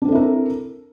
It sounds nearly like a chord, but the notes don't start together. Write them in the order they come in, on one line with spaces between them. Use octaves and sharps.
D4 C4 A4 E4 A#4